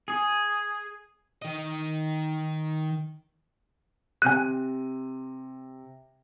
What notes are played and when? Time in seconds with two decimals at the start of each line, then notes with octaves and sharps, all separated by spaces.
0.08 G#4
1.42 D#3 D#5
4.22 C3 G#5 F#6 D#7